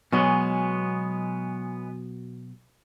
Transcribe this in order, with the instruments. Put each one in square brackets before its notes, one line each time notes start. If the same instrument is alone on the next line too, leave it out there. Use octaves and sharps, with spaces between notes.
[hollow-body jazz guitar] B2 F#3 [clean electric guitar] G#3 B3 C#4